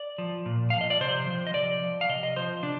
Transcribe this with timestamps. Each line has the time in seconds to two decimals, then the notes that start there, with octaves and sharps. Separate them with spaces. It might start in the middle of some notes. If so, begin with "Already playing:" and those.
Already playing: D5
0.18 F3
0.46 A#2
0.70 F3 F5
0.81 D#5
0.90 D5
1.01 C3 C5
1.27 F3
1.47 D#5
1.54 C3 D5
1.81 F3
2.01 F5
2.09 C3 D#5
2.23 D#5
2.36 F3 C5
2.62 C3 D4